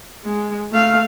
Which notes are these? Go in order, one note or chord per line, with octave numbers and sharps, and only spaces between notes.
G#3
A3 F5